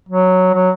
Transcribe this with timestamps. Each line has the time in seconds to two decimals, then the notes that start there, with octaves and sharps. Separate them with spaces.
0.09 F#3
0.54 F#3